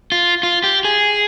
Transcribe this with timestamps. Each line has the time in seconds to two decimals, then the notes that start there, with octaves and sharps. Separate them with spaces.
0.12 F4
0.43 F4
0.64 G4
0.85 G#4